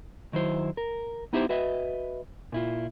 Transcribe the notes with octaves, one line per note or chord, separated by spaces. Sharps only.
D#3 F#3 E4 C5
A#4
B3 D#4 E4 G4 G#4 C5
F#4 B4 D#5 E5
A#2 E4 F4